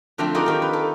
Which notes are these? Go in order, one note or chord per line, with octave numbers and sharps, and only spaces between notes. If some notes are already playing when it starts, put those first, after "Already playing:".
D3 F3 F#3 A3 C4 D4
D#4 F4 F#4 G#4 A#4 D5
D#3 G4
B4
A4